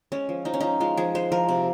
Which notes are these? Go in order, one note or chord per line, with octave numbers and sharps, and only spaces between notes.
G#3 C#4
F3
F3 D#4
C#4
F3 D#4
G#3 F4
F3 G#4
G#3 C5
F3 A#4
C3